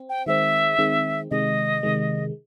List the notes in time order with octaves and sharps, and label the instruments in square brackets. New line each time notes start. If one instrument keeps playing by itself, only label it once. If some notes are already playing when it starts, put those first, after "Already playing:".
Already playing: [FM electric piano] C4
[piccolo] G5
[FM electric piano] D#3 G#3 C4 [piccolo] E5
[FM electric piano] D#3 G#3 C4
[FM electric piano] C3 D#3 G#3 [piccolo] D#5
[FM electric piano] C3 D#3 G#3